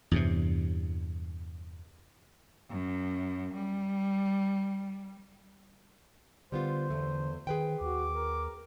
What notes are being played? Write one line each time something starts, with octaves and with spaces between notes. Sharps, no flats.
E2 G2 C3
F#2
G3
D3 G3 B3 F4 C5
E2 A3
D#3 G#4 B4 G5
D#2 F#4 D6
A#4